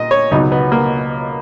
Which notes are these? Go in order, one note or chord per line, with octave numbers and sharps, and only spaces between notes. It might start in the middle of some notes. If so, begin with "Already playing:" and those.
Already playing: A#2 D#5
C#5
C#2 B2 F#3 D#4
B3
A#3